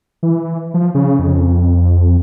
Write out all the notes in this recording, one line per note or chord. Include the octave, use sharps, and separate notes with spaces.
E3
F3
C#3
F2